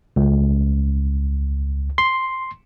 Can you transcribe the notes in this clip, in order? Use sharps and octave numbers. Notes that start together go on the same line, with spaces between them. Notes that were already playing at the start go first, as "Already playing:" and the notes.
C#2
C6